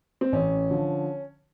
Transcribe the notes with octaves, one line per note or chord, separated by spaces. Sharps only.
C4
A1 C#4
D3 F3